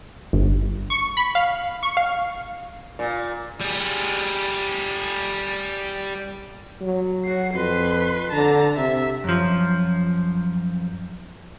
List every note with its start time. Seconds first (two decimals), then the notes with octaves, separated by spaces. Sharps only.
0.33 G1
0.90 C#6
1.17 B5
1.35 F5
1.83 C#6
1.97 F5
2.99 A#2
3.61 G3 G#4
6.81 F#3
7.25 F#4 C7
7.54 F2 B4 C6
8.32 D3 A5 A#5
8.77 C3 E5
9.24 F#2 F3